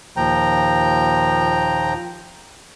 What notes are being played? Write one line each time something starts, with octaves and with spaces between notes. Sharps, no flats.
D#2 A#2 F3 G5 A#5